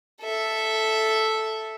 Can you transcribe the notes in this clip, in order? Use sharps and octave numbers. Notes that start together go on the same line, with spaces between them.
A4 E5